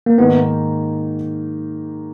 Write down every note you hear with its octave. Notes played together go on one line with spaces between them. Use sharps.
A#3
G#2 D#3 A#3 B3 D#4